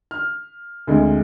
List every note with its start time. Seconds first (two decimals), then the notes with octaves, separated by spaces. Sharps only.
0.11 F6
0.87 D2 C3 G#3